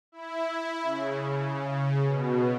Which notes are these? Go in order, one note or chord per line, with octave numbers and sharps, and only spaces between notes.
E4
C#3
B2